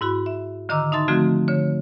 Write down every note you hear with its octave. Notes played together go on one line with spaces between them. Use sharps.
G#2 E4 F#4 B5
E5
D3 D#3 D#5 A#5 D6 E6
D#4 E5 A5 C6 A6
D3 F3 A3 C4 F#4
D3 C#5